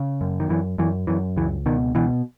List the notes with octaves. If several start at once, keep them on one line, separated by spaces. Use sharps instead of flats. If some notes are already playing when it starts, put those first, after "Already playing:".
Already playing: C#3
F#2
D#3
F#2 E3
F#2 E3
F#2 E3
C#2 E3
B2 D#3
B2 E3